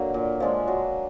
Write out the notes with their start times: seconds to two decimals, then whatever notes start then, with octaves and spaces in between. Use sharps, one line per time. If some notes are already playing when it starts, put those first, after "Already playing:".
Already playing: D3 F#3 A#3
0.14 A#2
0.40 F3 G#3 D4
0.68 F#3